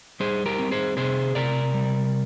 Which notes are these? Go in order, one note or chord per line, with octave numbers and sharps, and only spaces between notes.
G3 G#4 C5
G4 A#4
C4
G#4 C5
C3 G#4 C5
C3 A#4 D5
G3